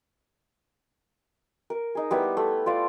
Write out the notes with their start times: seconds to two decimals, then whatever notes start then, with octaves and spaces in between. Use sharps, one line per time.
1.70 A#4
1.95 D#4 G#4
2.11 G3 B3 E4
2.37 A3
2.66 F4 D5 F5